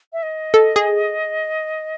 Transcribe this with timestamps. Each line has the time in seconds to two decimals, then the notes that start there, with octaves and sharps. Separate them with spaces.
0.13 E5
0.23 D#5
0.54 A4
0.76 G#4